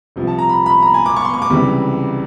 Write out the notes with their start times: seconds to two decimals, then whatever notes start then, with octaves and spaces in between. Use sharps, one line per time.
0.16 C2 C3 F3
0.27 A5
0.39 A#5
0.49 B5
0.66 B5
0.82 A#5
0.94 G#5
1.06 D6
1.16 C#6
1.25 C6
1.34 C#6
1.42 D6
1.50 C#2 C3 E3 G3